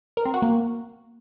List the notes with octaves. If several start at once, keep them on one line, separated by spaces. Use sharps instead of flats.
A#4
C4
F#4
A#3